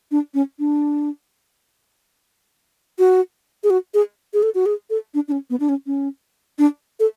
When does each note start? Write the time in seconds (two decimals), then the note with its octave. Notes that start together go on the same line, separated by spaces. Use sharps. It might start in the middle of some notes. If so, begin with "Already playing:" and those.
0.11 D4
0.34 C#4
0.59 D4
2.99 F#4
3.64 G#4
3.70 F#4
3.94 G#4
4.34 G#4
4.43 A4
4.55 F#4
4.66 G#4
4.90 A4
5.14 D4
5.28 D4
5.32 C#4
5.50 B3
5.60 D4
5.69 C#4
5.86 C#4
6.59 D4
7.00 A4